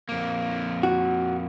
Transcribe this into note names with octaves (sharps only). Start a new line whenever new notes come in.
F2 A#3
F#4